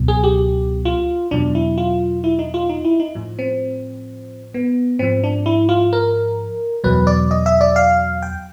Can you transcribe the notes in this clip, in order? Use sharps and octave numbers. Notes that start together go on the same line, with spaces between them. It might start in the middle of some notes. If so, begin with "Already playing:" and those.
Already playing: C#2 B2 F#3
G#4
G4
F4
E2 B2 F#3 D4
E4
F4
E4
D#4
F4
D#4
E4
D#4
A2 F3
C4
B3
G#2 F3 C4
D4
E4
F4
A#4
E2 B2 F#3 B4
D5
D#5
E5
D5
F5
G5